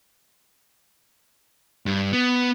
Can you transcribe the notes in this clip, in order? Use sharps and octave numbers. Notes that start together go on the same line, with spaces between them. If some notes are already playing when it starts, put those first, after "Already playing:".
G2
B3